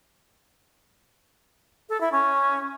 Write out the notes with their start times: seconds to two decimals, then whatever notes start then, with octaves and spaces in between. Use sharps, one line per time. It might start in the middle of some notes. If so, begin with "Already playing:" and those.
1.89 A4
2.01 E4
2.12 C#4